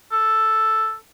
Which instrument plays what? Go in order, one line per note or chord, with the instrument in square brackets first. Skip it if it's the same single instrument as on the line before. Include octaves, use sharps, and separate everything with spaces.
[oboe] A4